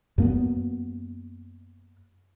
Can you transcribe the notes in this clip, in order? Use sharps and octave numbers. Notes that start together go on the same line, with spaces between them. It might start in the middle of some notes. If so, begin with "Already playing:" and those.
F#2 A#3 B3